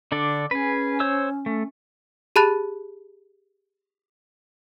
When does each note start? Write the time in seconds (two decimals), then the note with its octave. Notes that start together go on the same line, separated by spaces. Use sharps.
0.12 D3 D4 A4
0.51 C#4 G#4 B4
1.00 C5 C#5 E6
1.46 A3
2.36 G4 G#4 A5 B5 F#6 A6